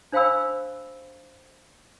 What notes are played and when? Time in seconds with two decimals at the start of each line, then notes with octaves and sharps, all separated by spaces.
0.12 D4 C5 F5 G5 B5 E6